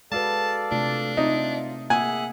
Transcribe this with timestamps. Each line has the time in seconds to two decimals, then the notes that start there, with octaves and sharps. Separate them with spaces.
0.12 G#3 F#4 A4 B4 D5 F5 A5
0.71 C3 A3 D4 F4
1.17 C4 D#4 F4 E5 F5
1.90 A#3 G#4 E5 F#5 G#5